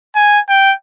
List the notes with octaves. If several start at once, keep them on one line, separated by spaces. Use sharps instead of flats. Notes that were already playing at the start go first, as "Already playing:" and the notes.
G#5
G5